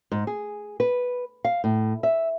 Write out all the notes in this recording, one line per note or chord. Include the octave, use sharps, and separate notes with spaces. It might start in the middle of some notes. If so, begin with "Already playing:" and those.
G#2
G#4
B4
F5
A2
E5